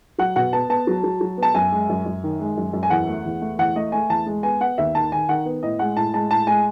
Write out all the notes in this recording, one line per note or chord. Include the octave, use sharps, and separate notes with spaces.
F#3 F#5
B2 F#5
B3 A5
B3 A5
F#3
F#3
F#3
B3
A5
F#2 G#5
G#3
F#2
F#2
D#3
G#3
F#2
F#2
G#5
E2 F#5
A3
E2
A3
E2 F#5
A3 D#5
A3 G#5
E2 A5
G#3
B3 G#5
B3 F#5
D#2 E5
D#3 A5
D#3 G#5
D#3 F#5
B3
A2 D#5
G#3 F#5
A2 A5
G#3 A5
A2 A5
G#3 G#5